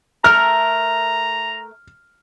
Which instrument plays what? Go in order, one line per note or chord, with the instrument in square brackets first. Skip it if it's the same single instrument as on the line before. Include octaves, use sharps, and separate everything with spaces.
[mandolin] A3 A#4 [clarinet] A#5 [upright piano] F6